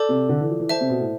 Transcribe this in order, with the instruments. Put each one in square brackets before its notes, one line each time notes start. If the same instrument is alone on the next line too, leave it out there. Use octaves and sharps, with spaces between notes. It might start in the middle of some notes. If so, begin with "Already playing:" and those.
Already playing: [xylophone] A4 D5 A5 D6 G6
[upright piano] C3
D3
E3
F3
E3
[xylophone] C5 E5 A5
[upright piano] C3
B2
A2